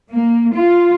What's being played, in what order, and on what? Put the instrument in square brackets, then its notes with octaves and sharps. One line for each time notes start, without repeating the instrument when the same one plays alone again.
[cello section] A#3
F4